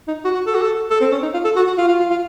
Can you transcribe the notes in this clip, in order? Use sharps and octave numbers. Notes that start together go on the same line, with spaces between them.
D#4
F#4
F#4
A4
F#4
A4
A4
C4
C#4
D#4
F4
A4
F#4
F#4
F4
F4
F4
F4